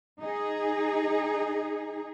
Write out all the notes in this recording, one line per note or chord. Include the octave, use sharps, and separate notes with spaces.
D#4 G#4